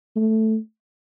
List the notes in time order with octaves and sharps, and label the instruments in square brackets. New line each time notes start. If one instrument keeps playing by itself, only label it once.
[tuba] A3